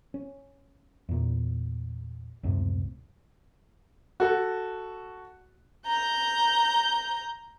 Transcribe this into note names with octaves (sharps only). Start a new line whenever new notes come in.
C#4
E2 A#2
C#2 F#2 A2 C3
F#4 A4
A#5 G6